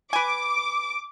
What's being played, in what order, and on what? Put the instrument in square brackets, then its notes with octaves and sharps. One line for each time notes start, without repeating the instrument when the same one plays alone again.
[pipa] B4 G#5 [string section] D6